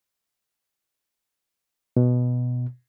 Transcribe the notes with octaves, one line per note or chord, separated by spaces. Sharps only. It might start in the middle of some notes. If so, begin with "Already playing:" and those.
B2